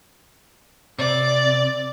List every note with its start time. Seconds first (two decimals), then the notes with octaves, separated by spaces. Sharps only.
0.99 C3 D5